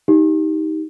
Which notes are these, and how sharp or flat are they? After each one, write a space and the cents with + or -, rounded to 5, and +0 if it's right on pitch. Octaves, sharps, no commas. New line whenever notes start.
D#4 +20 G4 +0